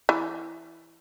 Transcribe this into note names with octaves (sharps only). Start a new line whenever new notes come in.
E3